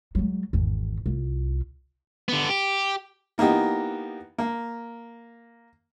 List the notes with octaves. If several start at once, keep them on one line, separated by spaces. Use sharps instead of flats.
F#3 G#3
G#1 E2
C2 F4
D3 B3
G4
E3 A#3 B3 D#4 G4
A#3